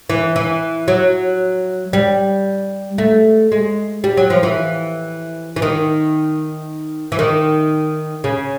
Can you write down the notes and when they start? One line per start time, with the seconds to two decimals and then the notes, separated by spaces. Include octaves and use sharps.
0.10 E3
0.36 E3
0.88 F#3
1.93 G3
2.98 A3
3.52 G#3
4.04 G3
4.17 F#3
4.30 F3
4.43 E3
5.56 E3
5.62 D#3
7.12 E3
7.19 D#3
8.24 C#3